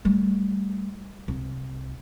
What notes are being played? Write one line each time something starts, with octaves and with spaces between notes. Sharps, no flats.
G3 A3
C2